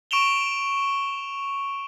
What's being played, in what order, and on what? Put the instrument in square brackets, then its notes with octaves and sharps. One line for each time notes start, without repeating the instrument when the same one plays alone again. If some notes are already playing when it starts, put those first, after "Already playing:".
[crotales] C#6 D7 E7 F7 G7